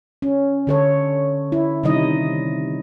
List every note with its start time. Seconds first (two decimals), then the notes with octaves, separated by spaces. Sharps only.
0.22 C#4
0.67 D3 A4 C#5
1.52 E4
1.83 C3 D#3 G3 D#4 E4 D#5